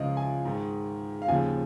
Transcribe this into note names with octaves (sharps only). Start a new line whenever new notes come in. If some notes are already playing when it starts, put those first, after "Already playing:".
Already playing: C#2 C#3 F3 D#5 F5
G#5
G#2 D#3
F5
D#2 C#3 F3 G#5